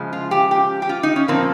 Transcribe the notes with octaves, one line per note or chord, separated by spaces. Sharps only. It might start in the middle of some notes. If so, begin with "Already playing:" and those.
Already playing: C#3 F3 G#3
F4
G4
G4
G4
F4
D#4
C#4
A#2 F3 A#3 C4